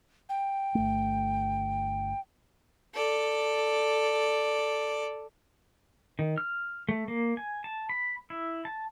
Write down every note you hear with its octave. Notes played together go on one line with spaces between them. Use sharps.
G5
G1 A3
A4 D5
D#3
F6
A3
A#3
G#5
A5
B5
E4
A5